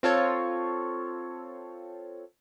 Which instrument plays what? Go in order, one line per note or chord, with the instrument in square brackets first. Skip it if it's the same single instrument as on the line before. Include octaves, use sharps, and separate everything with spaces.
[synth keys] C4 F4 A4 C#5